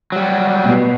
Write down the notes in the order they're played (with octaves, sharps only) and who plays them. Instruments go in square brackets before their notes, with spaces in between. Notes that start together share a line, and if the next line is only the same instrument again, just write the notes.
[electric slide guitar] F#3 G3
[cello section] B2